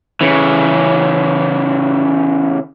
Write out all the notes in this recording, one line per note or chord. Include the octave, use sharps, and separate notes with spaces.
C#3 E3